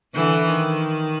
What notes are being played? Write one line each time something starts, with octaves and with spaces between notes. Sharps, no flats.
D3 E3
D#3